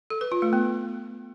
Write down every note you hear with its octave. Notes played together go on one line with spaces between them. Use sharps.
A4
B4
F4
A3
B3